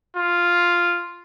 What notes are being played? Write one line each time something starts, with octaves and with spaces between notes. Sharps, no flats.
F4